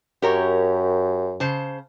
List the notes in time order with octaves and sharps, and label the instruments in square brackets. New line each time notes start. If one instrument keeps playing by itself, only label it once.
[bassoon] F#2 [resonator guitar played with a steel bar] G4 A#4 C#5
[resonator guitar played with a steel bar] C#3 C5 A5